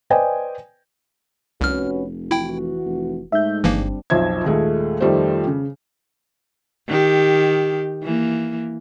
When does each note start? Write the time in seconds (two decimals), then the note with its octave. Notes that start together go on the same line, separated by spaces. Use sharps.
0.10 B4 C5 D5 D#5 G5 G#5
1.61 F1 C2 C#4 F#4 B4 F6
2.31 E3 E4 F#4 G5
2.85 F1
3.32 G#2 G#3 A3 E5 G6
3.64 G1 E3 F3 G3 A#3 C4 D4
4.10 B1 F2 C5 E5 G#6
4.44 D#2 A#2 G#3 A3
5.01 F2 D#3 G3 A3 C5
5.47 C#3
6.88 D#3 G4
8.03 E3 A#3